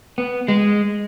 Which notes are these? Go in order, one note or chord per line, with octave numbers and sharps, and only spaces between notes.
B3
G#3